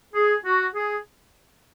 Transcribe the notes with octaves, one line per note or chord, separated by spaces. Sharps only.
G#4
F#4
G#4